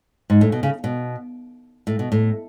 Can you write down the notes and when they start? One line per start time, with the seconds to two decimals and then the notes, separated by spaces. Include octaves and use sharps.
0.30 G#2
0.41 A2
0.52 B2
0.63 C#3
0.84 B2
1.87 A2
1.99 B2
2.12 A2